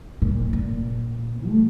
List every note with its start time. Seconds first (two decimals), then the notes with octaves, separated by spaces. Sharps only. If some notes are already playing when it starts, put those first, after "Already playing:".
0.22 A#2
0.53 A#2
1.47 A3